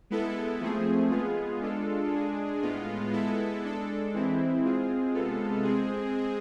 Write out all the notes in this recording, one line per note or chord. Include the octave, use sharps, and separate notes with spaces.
G#3 B3 E4 A4
F3 A3 C4 G#4
G#3 B3 F4 G#4
G#3 D4 F4 A4
G#3 D4 G#4
A2 G#3 B3 F4
G#3 B3 E4 A4
G#3 D4 A4
E3 G#3 C4 E4
G#3 C4 F4 G#4
C3 G#3 B3 F4 A4
G#3 C4 G#4